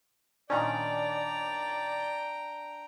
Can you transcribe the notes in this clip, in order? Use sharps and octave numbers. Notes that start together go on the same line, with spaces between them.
A#2 D#3 C#4 D4 D5 G5 A#5